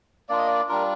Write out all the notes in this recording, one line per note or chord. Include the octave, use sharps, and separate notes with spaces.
A#3 D4 F4 D5
D#5
D5
G3 D4 F4 A#4